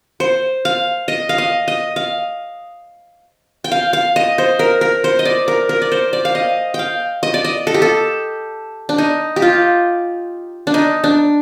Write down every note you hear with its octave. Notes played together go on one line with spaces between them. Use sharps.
C5
F5
D#5
F5
D#5
D#5
F5
G5
F5
F5
D#5
C5
A#4
A#4
C5
D#5
D5
A#4
A#4
D5
C5
D5
F5
D#5
F5 G5
D#5
D5
D#5
A4
G4
A4
D4
D#4
G4
F4
D4
D#4
D4